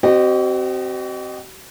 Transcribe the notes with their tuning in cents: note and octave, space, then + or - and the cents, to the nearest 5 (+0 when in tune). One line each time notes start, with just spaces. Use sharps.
C4 +0 F#4 +45 D#5 -30